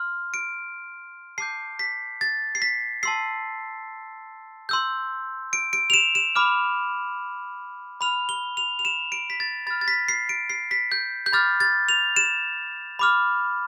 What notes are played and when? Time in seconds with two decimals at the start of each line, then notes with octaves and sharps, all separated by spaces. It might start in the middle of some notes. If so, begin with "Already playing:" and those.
Already playing: C6 F6
0.34 D7
1.38 A5 D6 G6 C7
1.79 B6
2.21 A6
2.55 C7
2.62 B6
3.03 A5 C6 E6 C7
4.69 C6 E6 G6
5.53 D7
5.73 D7
5.90 F7
5.94 E7
6.15 E7
6.36 B5 D6 F6
8.01 B5 F6 F7
8.29 G7
8.57 F7
8.79 F7
8.85 E7
9.12 D7
9.30 B6
9.40 A6
9.67 B5 F6 A6
9.81 A6
9.88 B6
10.09 C7
10.29 D7
10.50 C7
10.71 B6
10.92 G6
11.26 G6
11.33 B5 D6 F6 A6
11.60 A6
11.89 F7
12.16 E7
12.99 B5 D6 F6